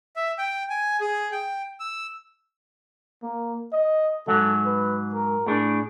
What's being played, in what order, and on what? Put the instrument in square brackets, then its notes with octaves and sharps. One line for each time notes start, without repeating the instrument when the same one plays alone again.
[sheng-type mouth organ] E5
G5
G#5
G#4
G5
E6
[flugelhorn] A#3
D#5
[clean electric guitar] G#2 F#3 [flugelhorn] A4
[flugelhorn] B4
A#4
[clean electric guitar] A2 D4 [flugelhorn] G#4